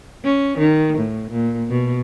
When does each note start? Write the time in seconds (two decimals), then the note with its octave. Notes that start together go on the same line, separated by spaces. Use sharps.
0.24 C#4
0.58 D#3
0.97 A2
1.30 A#2
1.70 B2